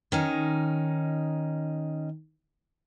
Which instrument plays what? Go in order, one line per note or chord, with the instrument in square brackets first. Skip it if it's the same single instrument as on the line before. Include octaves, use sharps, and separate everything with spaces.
[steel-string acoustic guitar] D#3 C#4 D#4